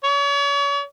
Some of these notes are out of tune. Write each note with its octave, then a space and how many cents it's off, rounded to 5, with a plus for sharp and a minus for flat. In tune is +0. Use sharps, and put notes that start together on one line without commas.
C#5 +40